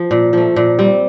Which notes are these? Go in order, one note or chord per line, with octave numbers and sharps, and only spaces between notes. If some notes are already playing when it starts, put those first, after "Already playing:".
Already playing: F3
A#2
F3 A3
A#2
G3 C4